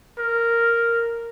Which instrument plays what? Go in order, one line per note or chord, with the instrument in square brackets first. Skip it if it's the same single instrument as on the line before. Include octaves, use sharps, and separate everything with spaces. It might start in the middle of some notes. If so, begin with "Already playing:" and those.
[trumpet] A#4